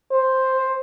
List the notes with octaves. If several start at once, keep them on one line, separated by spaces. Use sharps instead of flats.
C5